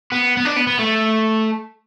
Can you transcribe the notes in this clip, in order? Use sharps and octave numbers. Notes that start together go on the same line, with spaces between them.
B3
B3
D4
B3
B3
A3